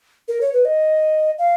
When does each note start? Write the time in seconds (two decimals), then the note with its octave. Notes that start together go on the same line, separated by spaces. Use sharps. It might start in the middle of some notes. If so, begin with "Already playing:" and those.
0.28 A#4
0.41 C#5
0.53 B4
0.65 D#5
1.39 F5